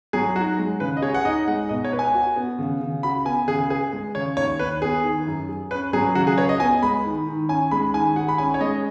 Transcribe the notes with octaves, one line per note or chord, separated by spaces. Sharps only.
F#3 G#4
D#4 F#4
G#3
C#3 B4
D#5
G#4 C#5
F#5
D#4 D#5
G#3 F#5
B2 D#5
C#5
B4
G#5
F#4
B3
C#3
C#3
F#4 B5
B3 G#5
C#3 G#4
G#4 B4
G#3
C#3 C#5
D#2 C#5
D#2 B4
B3 G#4
D#3
F#2
G#4
C#4 B4
F#3 G#4
C#3 F#4
G#4
B4 C#5
D#5
B3 G#5
G#3 B5
D#3
D#3
C#4 G#5
G#3 B5
D#3 G#5
G#4 F#5
B5
C#4 G#5
C#5
G#3 D#5